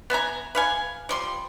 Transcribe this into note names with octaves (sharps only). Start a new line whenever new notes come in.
B3 E5 G#5 A#5
B4 F5 G#5
F3 G3 C6